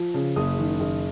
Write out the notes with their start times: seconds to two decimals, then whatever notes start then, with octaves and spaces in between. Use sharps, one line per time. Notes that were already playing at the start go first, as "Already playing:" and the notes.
Already playing: F3
0.14 C#3
0.36 F#1 D#6
0.59 D#3
0.80 F#1